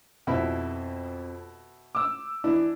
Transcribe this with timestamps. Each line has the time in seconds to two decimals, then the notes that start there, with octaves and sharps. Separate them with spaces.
0.27 F2 B2 E4 B5
1.95 D6 E6
2.44 E3 D4 E4